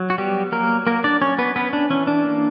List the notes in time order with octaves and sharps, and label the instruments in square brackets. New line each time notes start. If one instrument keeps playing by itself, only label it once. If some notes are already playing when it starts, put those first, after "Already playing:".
Already playing: [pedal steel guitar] F#3
F#4
G3 B3 G4
F#3 A#3 A#4
F#3 A#3 A#4
D4 D5
F#3 C#4 C#5
B3 B4
B3 C#4 B4
D4
E3 C#4
D4
A#3